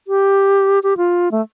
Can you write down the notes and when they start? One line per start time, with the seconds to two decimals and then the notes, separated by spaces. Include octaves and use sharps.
0.08 G4
0.83 G4
0.97 F4
1.32 A3